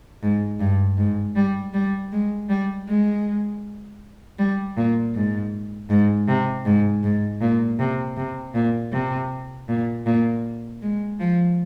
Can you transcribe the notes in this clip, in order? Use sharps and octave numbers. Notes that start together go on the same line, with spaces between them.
G#2
G2
G#2
G3
G3
G#3
G3
G#3
G3
A#2
G#2
G#2
C3
G#2
G#2
A#2
C3
C3
A#2
C3
A#2
A#2
G#3
F3